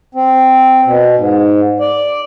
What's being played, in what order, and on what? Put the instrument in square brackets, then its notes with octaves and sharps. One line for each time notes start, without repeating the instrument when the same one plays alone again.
[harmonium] C4
B2
G#2
D5